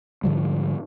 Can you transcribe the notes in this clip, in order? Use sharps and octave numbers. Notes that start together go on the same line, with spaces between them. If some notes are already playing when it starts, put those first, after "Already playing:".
G#2 D3 F3 G3